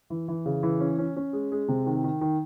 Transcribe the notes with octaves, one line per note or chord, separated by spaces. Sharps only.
E3
E3
C#3
E3
C#4
C#4
C#4
G#3
G#3
C3
D#3
D#3
D#3